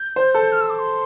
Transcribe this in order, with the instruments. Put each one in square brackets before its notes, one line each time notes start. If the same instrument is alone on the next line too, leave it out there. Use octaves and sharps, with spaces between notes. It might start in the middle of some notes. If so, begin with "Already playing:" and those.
Already playing: [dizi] G6
[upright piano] C5
A4
[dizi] F6
E6
D6
C6